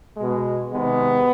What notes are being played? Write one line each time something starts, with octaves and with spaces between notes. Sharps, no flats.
B2 G#3
C3 D#3 G#3 B3